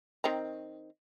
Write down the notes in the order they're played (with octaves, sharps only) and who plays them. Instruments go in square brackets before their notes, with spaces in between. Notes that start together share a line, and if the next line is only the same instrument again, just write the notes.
[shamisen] D#3 C4 A#5